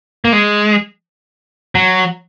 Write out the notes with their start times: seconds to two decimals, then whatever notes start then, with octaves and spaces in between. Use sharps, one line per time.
0.25 A#3
0.33 G#3
1.75 F#3